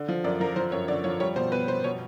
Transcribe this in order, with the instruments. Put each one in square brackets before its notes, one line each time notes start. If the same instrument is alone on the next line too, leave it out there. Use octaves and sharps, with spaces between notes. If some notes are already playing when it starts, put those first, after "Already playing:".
Already playing: [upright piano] D3
F3
[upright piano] F#2 [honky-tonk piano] D5
[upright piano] F3 [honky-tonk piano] A#4
[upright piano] F3 [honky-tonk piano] C5
[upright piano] F#2 [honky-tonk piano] C#5
[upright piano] D3 [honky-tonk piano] D5
[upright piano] F3 [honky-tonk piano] C#5
[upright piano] G3 [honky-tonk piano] C#5
[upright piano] B2 [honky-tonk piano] C5
[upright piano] B3 [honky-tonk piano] B4
[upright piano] B3 [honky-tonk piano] C5
[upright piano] B2 [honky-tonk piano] C#5